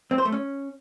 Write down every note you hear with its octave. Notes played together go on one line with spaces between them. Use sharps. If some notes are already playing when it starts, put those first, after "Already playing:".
C4
C5
A3
C#4